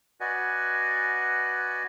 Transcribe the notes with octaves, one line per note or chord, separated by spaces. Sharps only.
F#4 B4 D5 D#5 F#5 G#5